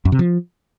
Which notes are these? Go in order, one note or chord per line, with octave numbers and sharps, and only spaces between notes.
F#2
C3
F3